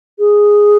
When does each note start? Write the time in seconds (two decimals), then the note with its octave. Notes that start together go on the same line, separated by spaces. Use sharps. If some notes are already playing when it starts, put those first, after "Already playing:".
0.19 G#4